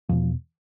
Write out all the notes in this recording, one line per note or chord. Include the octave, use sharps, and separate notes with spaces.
E2 B2 F3